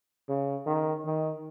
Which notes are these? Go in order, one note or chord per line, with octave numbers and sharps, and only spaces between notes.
C#3
D#3
D#3